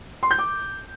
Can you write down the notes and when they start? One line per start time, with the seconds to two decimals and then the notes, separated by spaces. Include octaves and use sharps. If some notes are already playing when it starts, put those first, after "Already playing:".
0.23 C6
0.31 G6
0.39 D6